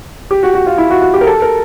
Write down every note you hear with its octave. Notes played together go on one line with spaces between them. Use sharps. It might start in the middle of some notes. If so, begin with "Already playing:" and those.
G4
F#4
F#4
F4
E4
F#4
F#4
G4
A#4
A4
A#4